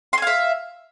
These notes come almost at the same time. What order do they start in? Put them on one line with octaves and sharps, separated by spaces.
C6 G#5 F5 E5